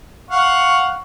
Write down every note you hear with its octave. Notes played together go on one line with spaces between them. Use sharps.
F5 F#5 C#6